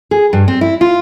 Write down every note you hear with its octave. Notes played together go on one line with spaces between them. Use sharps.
G#4
G2
C4
E4
F4